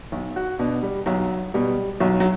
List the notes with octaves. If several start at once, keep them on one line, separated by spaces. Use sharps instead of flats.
B1
F#4
B2 D4
G3
B1 F#3
B2 G3
B1 F#3
F#3